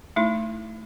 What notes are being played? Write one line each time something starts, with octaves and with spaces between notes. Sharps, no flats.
A3 D#4 E4